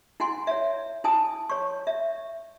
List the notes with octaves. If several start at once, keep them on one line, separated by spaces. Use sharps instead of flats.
E4 F#5 G#5 C6
C#5 E5
E4 G#5 A5 D#6
C#5 C#6
E5